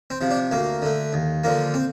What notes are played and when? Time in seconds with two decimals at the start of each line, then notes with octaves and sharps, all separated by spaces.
0.10 C4
0.21 C3 F3
0.31 D4
0.51 D2 A#3
0.82 D3 A3
1.13 D#2
1.44 D3 F3 A#3
1.74 C4